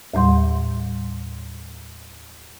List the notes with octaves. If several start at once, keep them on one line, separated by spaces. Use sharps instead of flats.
D#2 A2 G3 C6